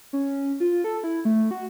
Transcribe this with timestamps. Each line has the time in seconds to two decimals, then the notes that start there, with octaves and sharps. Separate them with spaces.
0.13 C#4
0.60 F4
0.84 A4
1.04 E4
1.25 A3
1.51 F#4